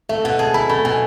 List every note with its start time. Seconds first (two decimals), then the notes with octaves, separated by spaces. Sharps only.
0.09 A3 E5
0.24 B2 F#5
0.39 G#4 A5
0.54 E4 B5
0.69 A3 B5
0.85 B2 G#5